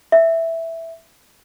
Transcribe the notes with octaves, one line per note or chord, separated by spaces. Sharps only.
E5